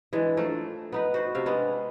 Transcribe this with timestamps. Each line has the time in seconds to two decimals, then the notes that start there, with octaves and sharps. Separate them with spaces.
0.13 E3 G#3 D4
0.37 F3 A3 D4 A#4
0.92 B3 D#4 B4
1.14 F#4 C5
1.35 C3 E5 F5
1.46 G#3 B3 D4